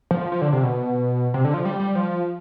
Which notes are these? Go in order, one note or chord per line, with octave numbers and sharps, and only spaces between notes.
F3
F3
F3
D3
C3
B2
C3
D3
F3
G3
G3
F3